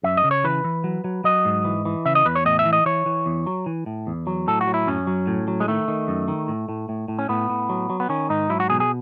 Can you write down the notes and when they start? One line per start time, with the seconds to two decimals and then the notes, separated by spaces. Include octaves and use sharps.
0.03 F#2 E5
0.17 D#5
0.24 C#3
0.31 C#5
0.44 E3 B4
0.64 E3
0.84 F#3
1.04 F#3
1.24 F#3 D#5
1.45 G#2
1.65 E3
1.85 E3
2.05 C#3 E5
2.15 D#5
2.25 E2 B4
2.35 C#5
2.45 A2 D#5
2.59 E5
2.65 E3
2.73 D#5
2.86 E3 C#5
3.06 E3
3.26 E2
3.46 F#3
3.66 E3
3.86 A2
4.07 E2
4.27 F#3
4.47 A2 A4
4.61 F#4
4.68 F#3
4.74 E4
4.87 F#2 C#4
5.07 F#3
5.27 A2
5.48 F#3
5.60 G#3
5.68 D#3 A3
5.88 D#3
6.08 F#2
6.28 D#3
6.48 A2
6.69 A2
6.89 A2
7.08 A2
7.19 C#4
7.29 A2 B3
7.50 A2
7.69 F#3
7.90 F#3
8.00 B3
8.09 D#3 C#4
8.30 G#2 D#4
8.50 F#3 E4
8.60 F#4
8.70 B2 G#4
8.80 G#4